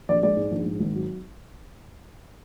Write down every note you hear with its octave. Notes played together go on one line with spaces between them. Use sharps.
A#1 D5
G#3 D5
G#2
A#1
G#2
G#1
F#3